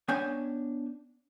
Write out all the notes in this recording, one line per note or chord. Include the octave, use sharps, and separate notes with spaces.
B3 C#4 D4 G5 G#5